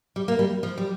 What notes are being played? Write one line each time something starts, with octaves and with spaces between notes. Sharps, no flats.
G3
A#3
G3
F3
G3